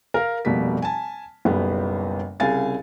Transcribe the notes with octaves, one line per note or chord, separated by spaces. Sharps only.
A#4 F5
F1 B2 G3 A#3 B6
G#5 A5
F#1 B1 G3 B3
C2 C#3 F5 G#5 A6